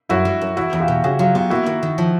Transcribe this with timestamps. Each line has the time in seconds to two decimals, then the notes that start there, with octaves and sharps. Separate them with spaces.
0.09 F#2 E4 F#4
0.25 G3
0.41 F#2
0.57 E2 E4 F#4
0.73 E2
0.80 F4 G4
0.88 B2
1.04 C#3 F#4 G#4
1.19 F#3 F4 G4
1.35 B3 F4 G4
1.50 A#3 E4 F#4
1.66 D#3
1.83 D#3
1.98 F3